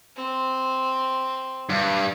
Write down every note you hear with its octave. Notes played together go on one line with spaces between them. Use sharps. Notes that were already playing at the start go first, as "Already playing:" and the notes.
C4
G2